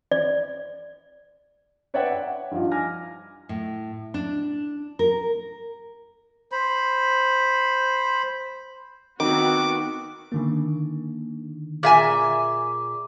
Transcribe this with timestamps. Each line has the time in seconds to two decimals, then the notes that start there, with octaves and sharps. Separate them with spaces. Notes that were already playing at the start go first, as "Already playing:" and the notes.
0.12 D5
1.94 B4 C#5 D5 E5 F#5 G5
2.12 F#5
2.51 G2 F3 D#4 F4
2.72 G#5 D6 F6 A#6
3.49 A2
4.14 D4
4.99 A#4
6.52 C5 B5
9.20 D#3 B3 C4 F#4 D6
10.32 D3 D#3 A#3
11.83 A#2 G#4 E5 G#5 D6